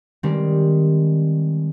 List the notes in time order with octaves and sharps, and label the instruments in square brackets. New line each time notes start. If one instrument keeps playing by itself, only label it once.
[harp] D#3 G3 G#3 C4